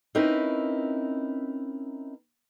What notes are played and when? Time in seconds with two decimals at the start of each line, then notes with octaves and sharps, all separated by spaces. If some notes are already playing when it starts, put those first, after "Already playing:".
0.15 C4 C#4 D#4 E4 A#4 B4